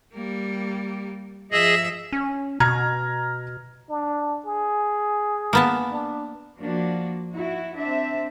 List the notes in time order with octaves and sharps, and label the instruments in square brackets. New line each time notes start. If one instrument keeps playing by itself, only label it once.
[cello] G3 A#3
[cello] F3 E5 [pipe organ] G#4 D#5
[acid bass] C#4
[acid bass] B2 [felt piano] A#5 F6 G#6
[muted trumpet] D4
G#4
[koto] A#3 B3 A5
[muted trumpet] D4
[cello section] F3 A#3 D4 F#4
E4 F#4
C4 D4 E5